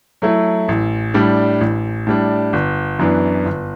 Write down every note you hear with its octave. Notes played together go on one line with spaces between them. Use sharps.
F#3 A3 E4
A1
A2 G3 D4
A1
A2 G3 D4
G1
F#2 E3 B3 D4
G1